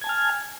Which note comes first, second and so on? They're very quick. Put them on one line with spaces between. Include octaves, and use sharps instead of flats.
G#6 A5 G#5 F6